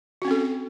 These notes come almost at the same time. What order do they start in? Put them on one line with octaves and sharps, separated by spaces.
F#4 C#4 C4 A4